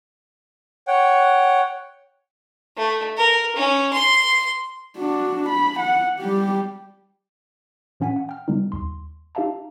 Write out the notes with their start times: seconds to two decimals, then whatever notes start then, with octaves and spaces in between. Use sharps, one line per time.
0.87 C#5 F#5 G5
2.77 A3
3.17 A#4
3.56 C#4
3.93 C6
4.98 D4 F#4
5.50 B5
5.80 F#5
6.20 G3 G4
8.00 A#2 E3 C#4 F#5 G#5 B6
8.16 F#5
8.29 G5 F6
8.48 C#3 G3 B3 D#4
8.72 D#2 C6
9.35 D#4 G4 E5 F5 A5 A#5